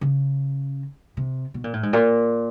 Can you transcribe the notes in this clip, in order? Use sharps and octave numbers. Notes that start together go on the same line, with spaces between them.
C#3
C3
B2
A#2
A2
G#2
A#2